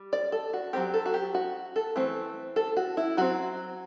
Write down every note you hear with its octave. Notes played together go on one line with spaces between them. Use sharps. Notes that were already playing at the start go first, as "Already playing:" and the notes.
Already playing: G3
D5
A4
F#4
F#3 C4 G4
A4
F#4
G4
F#4
A4
E3 A3 C4
A4
F#4
E4
F#3 C4 F#4